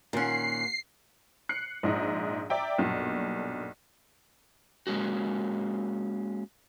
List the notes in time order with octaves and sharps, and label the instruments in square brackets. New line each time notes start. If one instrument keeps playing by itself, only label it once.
[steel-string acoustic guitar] A#2 F#5 [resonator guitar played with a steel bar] D#3 C#4 [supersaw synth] C7
[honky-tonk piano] F#6 C7 C#7
A#1 G#2 D#5
D5 E5 G5 A#5
B1 G2 A#2
[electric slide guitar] G#3 A#3 C#4 F#4